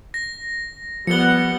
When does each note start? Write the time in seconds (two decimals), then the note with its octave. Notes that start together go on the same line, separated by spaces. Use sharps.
0.14 A#6
1.07 F3 G3 B3 F#5 C#7 G7